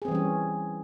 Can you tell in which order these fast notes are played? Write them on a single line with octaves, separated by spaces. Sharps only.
G#4 C4 E3 G3 C#4